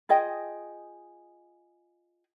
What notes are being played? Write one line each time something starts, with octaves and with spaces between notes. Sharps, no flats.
F4 G#4 D#5 G5